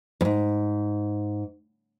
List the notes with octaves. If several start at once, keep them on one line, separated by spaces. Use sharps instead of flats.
F2 G#2